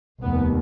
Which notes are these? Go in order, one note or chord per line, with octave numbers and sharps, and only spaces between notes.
F1 D#2 B3